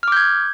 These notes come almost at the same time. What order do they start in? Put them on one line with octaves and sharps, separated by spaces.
F6 D6 G6 G#6